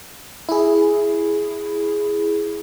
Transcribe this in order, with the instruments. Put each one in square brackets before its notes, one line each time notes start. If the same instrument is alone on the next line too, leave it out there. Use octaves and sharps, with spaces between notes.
[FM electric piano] E4 G#4